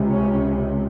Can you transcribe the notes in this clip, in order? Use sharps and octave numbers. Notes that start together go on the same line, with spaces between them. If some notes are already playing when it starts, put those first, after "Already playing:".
Already playing: C#2 C3
C#4